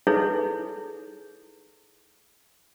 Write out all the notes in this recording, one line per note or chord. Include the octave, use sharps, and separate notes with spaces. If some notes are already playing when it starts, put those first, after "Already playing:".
D#4 E4 G#4 A4 B4 C#5